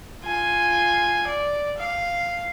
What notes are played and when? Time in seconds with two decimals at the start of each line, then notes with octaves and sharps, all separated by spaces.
0.23 F4 G#5
1.27 D5
1.78 F5